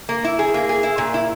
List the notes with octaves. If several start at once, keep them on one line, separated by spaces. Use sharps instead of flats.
A#3
E4
G#4
A#3
G#4
E4
A#2
E4